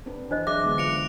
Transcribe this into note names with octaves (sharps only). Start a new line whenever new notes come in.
C4 D4 B4
E3 D4 C5 D#5
F#3 G#4 E5 D6 F#6 A#6
D3 G#3 B3
F4 C#7 D7 F7